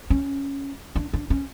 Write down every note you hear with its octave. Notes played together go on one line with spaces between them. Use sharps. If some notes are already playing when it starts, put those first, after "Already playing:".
C#4
D4
D4
C#4